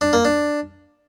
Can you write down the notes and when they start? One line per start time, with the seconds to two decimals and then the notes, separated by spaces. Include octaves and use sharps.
0.01 D4
0.13 A#3
0.25 D4